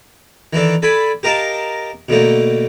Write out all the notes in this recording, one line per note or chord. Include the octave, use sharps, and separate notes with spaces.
D#3 E3 D4 A4
A4 D5 G#5 B5
G4 A#4 D#5 F5 A5
B2 D3 A3 A#3